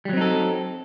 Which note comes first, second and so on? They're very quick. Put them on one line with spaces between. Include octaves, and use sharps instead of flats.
G3 F#3 C4 D#4 A4